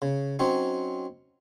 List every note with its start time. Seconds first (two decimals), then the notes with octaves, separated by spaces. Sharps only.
0.02 C#3
0.39 F#3 C4 C#4 D#4